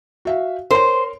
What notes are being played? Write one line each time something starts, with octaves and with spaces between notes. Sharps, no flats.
F#4 E5 F5
A#4 C5 C#5 C6